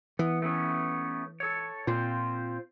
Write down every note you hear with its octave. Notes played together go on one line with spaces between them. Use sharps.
E3 B3
A3 B3 C#4
A4 C#5
A#2 C4 F4 C5